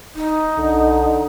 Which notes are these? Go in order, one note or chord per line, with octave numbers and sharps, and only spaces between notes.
D1 D#4
B1 D3